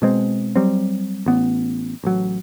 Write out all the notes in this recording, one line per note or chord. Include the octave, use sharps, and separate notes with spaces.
B2 G#3 C4
F#3 G3 C4
A1 B3
A1 F#3